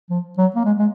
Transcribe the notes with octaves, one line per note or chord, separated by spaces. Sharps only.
F3
F#3
A#3
G#3
G#3